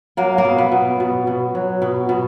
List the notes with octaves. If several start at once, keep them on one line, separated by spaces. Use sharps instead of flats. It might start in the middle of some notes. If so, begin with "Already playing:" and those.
F#3 A#3
A#3
B2
B3
B2
B2
B2
F#3
B2
B2